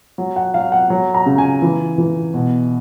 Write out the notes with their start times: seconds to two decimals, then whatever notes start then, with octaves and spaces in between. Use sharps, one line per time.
0.18 F#3
0.36 F#5
0.54 F#3 F5
0.72 F#5
0.90 F#3
1.14 A#5
1.26 C#3
1.38 G#5
1.62 E3
1.98 E3
2.34 B2